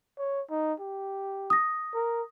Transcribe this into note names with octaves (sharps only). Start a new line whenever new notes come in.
C#5
D#4
G4
D#6 A#6
A#4